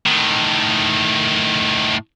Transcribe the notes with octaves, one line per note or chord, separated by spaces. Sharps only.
A2 D#3